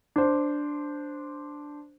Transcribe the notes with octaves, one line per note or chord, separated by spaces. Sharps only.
D4 C5